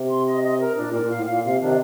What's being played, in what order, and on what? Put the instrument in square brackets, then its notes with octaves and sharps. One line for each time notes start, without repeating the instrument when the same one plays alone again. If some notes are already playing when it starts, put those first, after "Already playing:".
Already playing: [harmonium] C3
[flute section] C6
D#5
D#5
A#4
[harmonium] A#2 [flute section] D4
[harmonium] A#2
[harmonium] A2 [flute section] A#4
[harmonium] A#2
[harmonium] A2 [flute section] F5
[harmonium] A#2 [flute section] F5
[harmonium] C3 [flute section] F5
[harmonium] C3 D#3 [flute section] D4